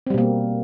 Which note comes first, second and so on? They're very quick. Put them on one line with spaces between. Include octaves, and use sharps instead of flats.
C4 G3 B2 A#3